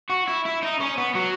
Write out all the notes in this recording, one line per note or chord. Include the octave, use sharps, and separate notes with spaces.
F#4
E4
E4
D#4
C#4
B3
F#3